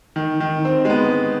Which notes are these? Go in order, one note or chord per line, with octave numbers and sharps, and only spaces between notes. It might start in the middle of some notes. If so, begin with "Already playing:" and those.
D#3
D#3
C4
G#3
B3